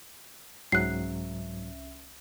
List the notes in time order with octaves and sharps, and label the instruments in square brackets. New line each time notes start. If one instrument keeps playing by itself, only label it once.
[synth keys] C2 C#4 E5 [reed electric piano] G#2 F#3 [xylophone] F#6 C7